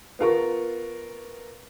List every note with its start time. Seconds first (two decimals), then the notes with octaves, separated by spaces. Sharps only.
0.19 B3 F4 A#4 C#6